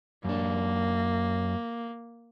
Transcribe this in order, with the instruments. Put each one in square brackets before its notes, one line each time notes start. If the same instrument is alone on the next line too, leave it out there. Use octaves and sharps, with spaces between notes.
[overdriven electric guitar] F#2 D4 [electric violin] A#3